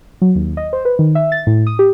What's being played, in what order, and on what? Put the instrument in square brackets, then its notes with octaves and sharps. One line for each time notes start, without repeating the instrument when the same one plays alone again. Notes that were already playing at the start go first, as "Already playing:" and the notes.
[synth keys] F#3
D#2
D#5
C5
B4
D#3
E5
A6
A2
D#6
G4